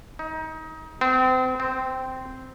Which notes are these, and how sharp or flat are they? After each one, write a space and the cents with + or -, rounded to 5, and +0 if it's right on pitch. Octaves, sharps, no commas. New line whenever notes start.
D#4 +25
C4 -35
C4 -10